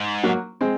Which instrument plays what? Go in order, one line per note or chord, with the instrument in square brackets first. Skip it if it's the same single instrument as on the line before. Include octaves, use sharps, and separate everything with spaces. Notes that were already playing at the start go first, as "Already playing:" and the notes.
Already playing: [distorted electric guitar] G#2
[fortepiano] F#3 A#3
G#3 C4